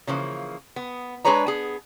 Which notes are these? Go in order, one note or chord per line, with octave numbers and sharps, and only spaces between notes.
C#3 E3 F3 A#3
B3
G#3 D4 G#4 B4 C#5 A#5
B3 G#4